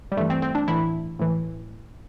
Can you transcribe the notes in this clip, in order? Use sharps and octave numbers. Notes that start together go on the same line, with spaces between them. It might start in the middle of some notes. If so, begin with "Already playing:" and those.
G3
G2 E3 A3
C4
C4
D4
A2 E3 E4
A2 E3